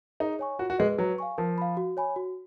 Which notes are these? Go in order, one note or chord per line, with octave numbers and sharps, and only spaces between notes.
D#4 G#4
C#5 G#5 C#6
F4 F#4
F#4
G#3 G#4 B4 D#5
F#3 B4
F5 G#5 C#6
F3 A#4
F5 B5
F#4
C#5 G#5 B5
F#4